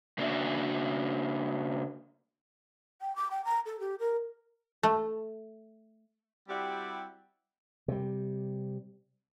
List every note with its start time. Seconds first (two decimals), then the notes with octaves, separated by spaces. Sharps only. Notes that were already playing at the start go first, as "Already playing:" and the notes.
0.18 C#3 A#3 D4 F#4 D5 E5
3.01 G5
3.15 D6
3.31 G5
3.44 A#5
3.66 A4
3.79 G4
3.99 A#4
4.83 A3
6.48 G3 C4 E4 F#4 G4 D5
7.88 C3 G3